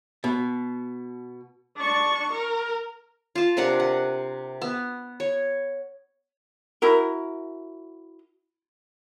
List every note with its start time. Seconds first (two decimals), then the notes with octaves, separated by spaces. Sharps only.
0.24 B2
1.77 D4 C#6
2.33 A#4
3.35 F4 A5
3.57 C3 D4 A#4 F#5
3.80 F#5
4.62 B3
5.20 C#5
6.82 E4 F#4 A#4